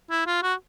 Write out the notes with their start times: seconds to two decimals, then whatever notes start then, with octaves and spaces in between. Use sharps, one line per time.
0.11 E4
0.26 F4
0.42 F#4